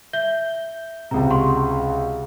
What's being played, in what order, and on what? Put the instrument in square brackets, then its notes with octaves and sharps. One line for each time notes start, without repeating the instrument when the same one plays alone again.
[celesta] E5 G6 G7
[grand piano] C#2 C3 [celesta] A#5
[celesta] F#5 C6 C#6